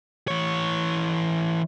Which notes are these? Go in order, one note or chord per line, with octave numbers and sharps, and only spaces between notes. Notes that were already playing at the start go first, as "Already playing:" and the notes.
E3 C#5